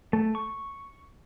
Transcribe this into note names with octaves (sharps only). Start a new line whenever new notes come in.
A3
C#6